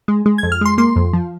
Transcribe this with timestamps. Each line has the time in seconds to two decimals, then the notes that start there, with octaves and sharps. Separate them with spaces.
0.08 G#3
0.26 G#3
0.38 F2 G#6
0.52 F6
0.61 G#3 C6
0.78 A#3 C6
0.96 F2
1.13 F3